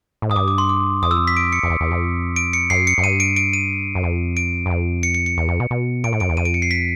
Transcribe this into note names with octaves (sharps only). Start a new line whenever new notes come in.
A2
G#2 D#6
G2 D6
D6
C6
D6
F2 D#6
E6
B6
D7
C#7
F2
E2
E2
F2
D7
C#7
F#2 C7
C#7
F#2
G2 D#7
D7
D7
D#7
F#2
F2
D7
F#2
F2
C#7
C#7
C#7
E2
F2
B2
B2
A#2 D7
A2
F#2 D7
E2
F2 D#7
D7
C#7
C7
B6